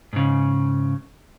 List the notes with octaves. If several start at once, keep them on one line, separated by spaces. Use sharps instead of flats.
G#2 C#3